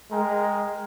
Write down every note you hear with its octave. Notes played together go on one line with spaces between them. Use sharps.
G#3 A#4 G5 A#5